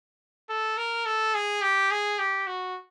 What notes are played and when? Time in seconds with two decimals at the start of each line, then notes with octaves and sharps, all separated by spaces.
0.50 A4
0.77 A#4
1.06 A4
1.35 G#4
1.62 G4
1.91 G#4
2.19 G4
2.47 F#4